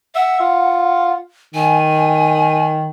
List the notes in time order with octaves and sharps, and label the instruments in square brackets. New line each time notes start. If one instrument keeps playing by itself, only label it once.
[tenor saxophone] E5 [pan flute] F#5
[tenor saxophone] F4
[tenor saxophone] D#3 [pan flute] G#5